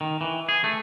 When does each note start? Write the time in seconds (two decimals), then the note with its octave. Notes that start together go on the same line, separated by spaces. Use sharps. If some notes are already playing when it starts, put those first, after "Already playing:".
0.01 D#3
0.21 E3
0.49 G#4
0.64 A3